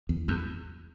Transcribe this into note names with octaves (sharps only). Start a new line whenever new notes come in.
E2
E2